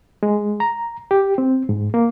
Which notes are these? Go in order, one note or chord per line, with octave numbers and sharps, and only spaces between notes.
G#3
A#5
G4
C4
G#2
A#3